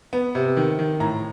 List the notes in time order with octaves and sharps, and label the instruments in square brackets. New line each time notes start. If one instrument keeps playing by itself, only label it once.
[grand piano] B3
C3
D#3
D#3
A2 A#5